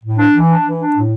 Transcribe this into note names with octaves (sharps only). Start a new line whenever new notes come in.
A2
D4
E3
D4
E3
D4
A2